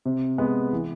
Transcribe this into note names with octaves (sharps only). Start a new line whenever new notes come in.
C3
G#3 B3
E3